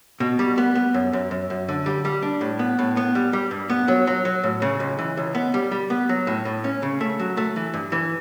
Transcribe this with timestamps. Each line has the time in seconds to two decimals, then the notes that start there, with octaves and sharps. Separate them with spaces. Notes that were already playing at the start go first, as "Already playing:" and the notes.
0.20 B2
0.39 G3
0.58 B3
0.75 B3
0.94 F#2
1.13 F#2
1.31 F#2
1.50 F#2
1.68 D3
1.86 G3
2.05 G3
2.22 D4
2.41 A2
2.59 B3
2.79 A2
2.97 B3
3.15 G3
3.33 G3
3.51 G2
3.70 B3
3.88 F#3
4.07 F#3
4.25 F#3
4.44 A2
4.62 C#3
4.80 C#2
4.99 E3
5.17 C#2
5.35 B3
5.54 G3
5.72 G3
5.90 B3
6.09 F#3
6.27 A2
6.45 A2
6.64 C#4
6.83 C#3
7.01 A3
7.19 F#3
7.37 A3
7.56 E3
7.74 G2
7.92 E3